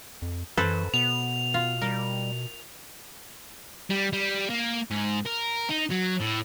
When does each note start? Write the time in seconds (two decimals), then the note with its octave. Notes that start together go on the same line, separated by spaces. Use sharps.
0.22 F2
0.57 F#2 E3 A4 B4 C5
0.94 B2 B3 F7
1.54 F4
1.81 G3 A#4
3.91 G3
4.13 G3
4.50 A#3
4.91 G#2
5.25 A#4
5.69 D#4
5.90 F#3
6.20 A2